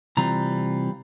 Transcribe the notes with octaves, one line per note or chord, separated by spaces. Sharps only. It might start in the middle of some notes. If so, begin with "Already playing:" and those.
C3 E3 G3 C4 F4 A#5